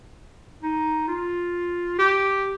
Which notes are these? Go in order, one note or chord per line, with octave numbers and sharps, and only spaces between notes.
D#4
F4
G4